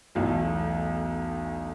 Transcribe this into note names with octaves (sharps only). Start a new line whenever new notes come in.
B1 E2 A3